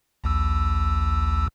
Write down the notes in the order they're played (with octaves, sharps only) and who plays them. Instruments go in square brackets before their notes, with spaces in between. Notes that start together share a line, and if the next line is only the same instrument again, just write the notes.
[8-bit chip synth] A#1 D#2 E6